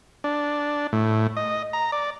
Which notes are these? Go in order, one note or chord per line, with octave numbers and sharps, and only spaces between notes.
D4
A2
D#5
A#5
D5